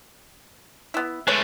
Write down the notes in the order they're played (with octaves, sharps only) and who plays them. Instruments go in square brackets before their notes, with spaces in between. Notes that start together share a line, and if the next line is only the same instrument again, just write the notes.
[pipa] B3 E4
[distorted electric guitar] G#3 A3 [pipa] B4 C#5